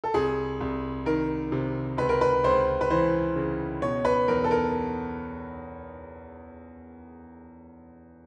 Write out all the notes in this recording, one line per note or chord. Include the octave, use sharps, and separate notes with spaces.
A4
C2 G#4
C2
D#3 A#4
C3
C#2 B4
A#4
B4
C#2 C5
B4
E3 C5
C#3
B2 C#5
B4
E2 A#4
A4
A#4